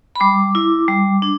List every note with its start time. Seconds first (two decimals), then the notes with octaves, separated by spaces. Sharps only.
0.16 B5
0.20 G3 D6
0.55 E4
0.88 G3
1.22 D4